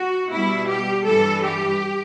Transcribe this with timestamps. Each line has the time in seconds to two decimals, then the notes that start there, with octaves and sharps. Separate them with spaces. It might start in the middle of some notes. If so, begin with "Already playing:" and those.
Already playing: F#4
0.30 B2 G3 E4
0.67 G4
1.05 G2 E3 G3 A4
1.43 G4